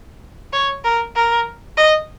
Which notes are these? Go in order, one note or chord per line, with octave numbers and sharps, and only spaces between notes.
C#5
A#4
A#4
D#5